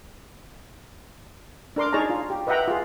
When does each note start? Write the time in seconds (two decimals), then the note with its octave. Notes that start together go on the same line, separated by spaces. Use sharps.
1.76 D4 A#4 C6 D6
1.93 D#4 G#4 C#5 A5 A#5
2.10 F4
2.30 G4
2.47 B4 D#5 E5 F#5 G5 A#5
2.68 F4 G#4